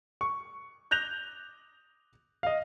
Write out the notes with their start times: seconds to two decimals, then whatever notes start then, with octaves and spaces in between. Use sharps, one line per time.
0.21 C#6
0.91 F#6 G6 A#6 F7
2.43 D#5 F5